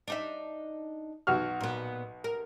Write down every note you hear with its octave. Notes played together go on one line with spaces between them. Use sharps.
D4 D#4 E5
B1 F#4 F6
A#2 B3
A#4